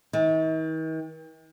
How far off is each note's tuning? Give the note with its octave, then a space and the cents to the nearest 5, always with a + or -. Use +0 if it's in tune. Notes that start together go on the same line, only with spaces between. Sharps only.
D#3 +45